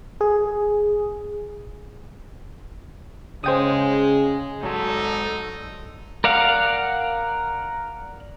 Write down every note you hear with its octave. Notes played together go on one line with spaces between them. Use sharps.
G#4
C#3 G#3 C5 G5 D#6
G#2 F#3 D#4 A4 D5 A5 C6
A#4 D5 F5 F#5